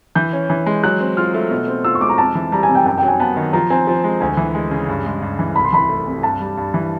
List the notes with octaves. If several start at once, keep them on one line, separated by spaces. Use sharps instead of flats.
E3 G6
C#4
E3
G#3
F#3 F#6
C4
F4 F6
A3
B2
C4
F4 E6
C#6
G#3 D6
A#5
F2 A5
E3
G3 A#5
G#5
C3
G5
F#2 G5
F#3 G5
G#5
B3 A5
D#3
F3 A#5
C4 G#5
F3 G#5
G#3
D2 G#5
E3
G#3
C#3
G2
G#3
G2
E3
C2 B5
C6
E3 B5
A3
C3
G2 A5
G3
G2
E3